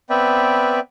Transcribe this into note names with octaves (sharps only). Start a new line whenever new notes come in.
B3 C4 B4 D5 E5 G5